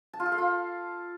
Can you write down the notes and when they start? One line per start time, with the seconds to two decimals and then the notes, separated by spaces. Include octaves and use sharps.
0.13 A5
0.20 F4
0.26 A4
0.32 F5
0.38 F4